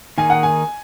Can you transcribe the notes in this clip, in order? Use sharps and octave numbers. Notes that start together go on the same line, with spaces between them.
D#3 A#3 D#4 G#4 G#5
F#5
G#5